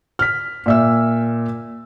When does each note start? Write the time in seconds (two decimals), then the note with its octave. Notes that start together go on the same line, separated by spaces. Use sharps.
0.19 F6 B6
0.66 A#2 E5 E6